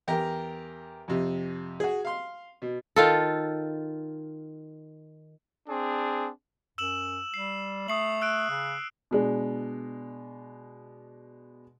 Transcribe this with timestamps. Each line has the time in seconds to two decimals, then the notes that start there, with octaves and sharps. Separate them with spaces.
0.07 E2 G4 A#4 A#5
1.08 F2 C3
1.80 F#4 G#4
2.05 F5 C6
2.62 B2
2.96 D#3 F4 A4
5.68 C4 D4 G#4
6.78 F#2 E6 E7 F#7
7.34 G3 C7
7.88 A3 D#6 C7 F#7
8.21 E6 F#6 D7
8.49 C#3
9.11 B2 G#3 D4